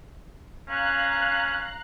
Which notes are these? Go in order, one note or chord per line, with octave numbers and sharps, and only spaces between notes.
C#4 F5 A#5 F#6